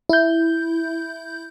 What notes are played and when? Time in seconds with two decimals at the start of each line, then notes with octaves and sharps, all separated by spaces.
0.09 E4 G6